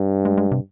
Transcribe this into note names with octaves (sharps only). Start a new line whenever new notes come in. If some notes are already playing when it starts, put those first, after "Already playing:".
Already playing: G2
G#3
G#3
C3